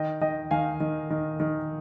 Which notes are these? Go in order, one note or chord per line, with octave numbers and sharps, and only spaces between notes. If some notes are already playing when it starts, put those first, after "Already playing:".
Already playing: D#3 D#5 G5
D#3 D#5 G5
D#3 F5 G#5
D#3
D#3
D#3